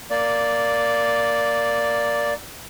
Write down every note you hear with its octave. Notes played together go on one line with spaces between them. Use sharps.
A#3 D5